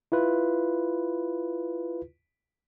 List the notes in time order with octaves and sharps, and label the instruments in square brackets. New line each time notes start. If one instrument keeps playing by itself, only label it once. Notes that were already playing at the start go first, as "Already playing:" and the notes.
[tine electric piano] E4 F4 B4